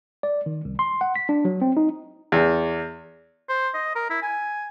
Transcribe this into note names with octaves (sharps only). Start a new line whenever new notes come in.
D5
D#3
C2
C6
F#5
B6
D4
F#3
C4
D#4
E2
C5
D#5
A#4
E4
G#5